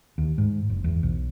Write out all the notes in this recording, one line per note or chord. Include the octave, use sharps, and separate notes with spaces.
D#2
G#2
F#1
E2
B1